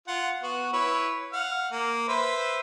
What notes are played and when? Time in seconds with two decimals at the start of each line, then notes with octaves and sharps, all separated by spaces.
0.08 F4 F#5
0.43 B3 F#4
0.73 E4 B4 C#5
1.33 F5 F#5
1.72 A#3
2.08 B4 C5 E5